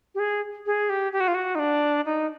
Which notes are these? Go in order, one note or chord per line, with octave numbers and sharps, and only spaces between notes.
G4
G#4
G#4
G4
G4
F#4
F4
F#4
D#4
D4
D#4